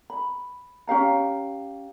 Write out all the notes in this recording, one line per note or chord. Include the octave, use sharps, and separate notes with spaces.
B5
C#4 G4 F5 A#5